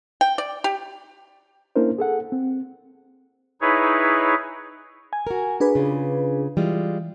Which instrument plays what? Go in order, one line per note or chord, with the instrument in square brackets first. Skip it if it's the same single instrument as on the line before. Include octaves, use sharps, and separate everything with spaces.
[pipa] G5
D5
G4
[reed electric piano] A#3 C#4 D4 E4 A#4 C5
G#4 A4 F#5
C4
[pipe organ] D#4 E4 G#4 B4 C#5
[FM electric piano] G#5
[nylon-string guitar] F#4 A#4
[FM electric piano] D4 G#4 B4
[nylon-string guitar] C#3 F4
[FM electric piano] E3 [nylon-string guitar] G3 G#3 F4